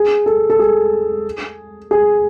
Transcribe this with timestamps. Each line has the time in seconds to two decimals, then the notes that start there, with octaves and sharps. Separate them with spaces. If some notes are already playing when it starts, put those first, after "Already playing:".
Already playing: G#4
0.26 A4
0.50 A4
0.59 G#4
1.91 G#4